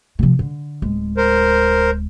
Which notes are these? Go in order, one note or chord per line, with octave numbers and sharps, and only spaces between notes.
C3 F3
D3
D1 G#3
A#4 C5